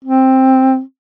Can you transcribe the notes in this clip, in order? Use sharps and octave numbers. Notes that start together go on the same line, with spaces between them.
C4